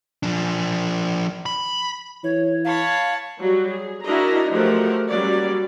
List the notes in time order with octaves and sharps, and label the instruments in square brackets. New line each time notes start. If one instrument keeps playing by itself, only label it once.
[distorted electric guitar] F3 D4
B5
[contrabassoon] E3 [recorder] C#5
[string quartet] C#5 A5 B5 [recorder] F5
[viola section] F#3 G3 F#4
G#4
D4 E4 F#4 A#4 D#5 A#5
F3 F#3 A3 G4 A#4 F#5
F#3 G3 A#3 C#4 D5